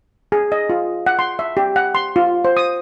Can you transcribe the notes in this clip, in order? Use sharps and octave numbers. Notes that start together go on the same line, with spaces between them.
G#4
D#5
F4
F#5
C6
E5
G4
F#5
C6
F4
C5
D#6